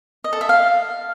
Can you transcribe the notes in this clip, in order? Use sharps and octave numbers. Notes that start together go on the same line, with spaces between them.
D#5
A4
E5
F5